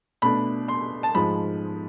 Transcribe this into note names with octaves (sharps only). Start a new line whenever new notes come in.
B2 A3 D4 B5
C6
A5
G#2 F3 G#3 B5